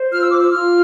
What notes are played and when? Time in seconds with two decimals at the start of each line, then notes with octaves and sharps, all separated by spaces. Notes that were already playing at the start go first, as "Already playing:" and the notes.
Already playing: C5
0.12 F4 F6
0.22 E6
0.31 D6
0.40 E6
0.52 F4 F6